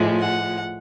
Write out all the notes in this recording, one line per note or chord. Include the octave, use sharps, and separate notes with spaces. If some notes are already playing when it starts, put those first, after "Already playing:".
Already playing: A2 F3 G#3
F#5